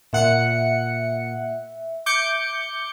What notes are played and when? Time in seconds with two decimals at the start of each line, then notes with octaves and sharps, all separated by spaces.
0.13 A#2 E5 F#5 C#7
2.06 D6 G6 C#7